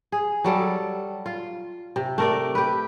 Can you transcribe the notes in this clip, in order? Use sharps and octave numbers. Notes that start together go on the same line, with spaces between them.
G#4
F#3 G3 A4
F4
C3
A3 A#4 D5
G4 B4